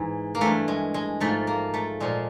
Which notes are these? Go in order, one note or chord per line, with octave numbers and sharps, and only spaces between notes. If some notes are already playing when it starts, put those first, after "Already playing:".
Already playing: G#2 E3
A#3
G2 E3 A3
G#3
G#3
G#2 F3 A3
A#3
A3
A#2 F3 G#3